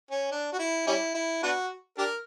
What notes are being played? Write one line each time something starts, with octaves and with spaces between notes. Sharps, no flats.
C#4
D4
F#4
E4
G3 C#4 E4
E4
B3 D4 F#4
D4 G4 A#4